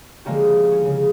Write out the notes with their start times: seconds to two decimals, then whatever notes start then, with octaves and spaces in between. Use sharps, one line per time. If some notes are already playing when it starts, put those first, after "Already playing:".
0.25 D3 F3 G#3 A#3 C#4 G4
0.71 C#4
0.85 C#3